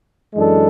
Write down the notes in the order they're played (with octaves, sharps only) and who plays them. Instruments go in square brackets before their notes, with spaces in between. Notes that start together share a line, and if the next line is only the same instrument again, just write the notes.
[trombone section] F#2 E3 G#3 D4 A4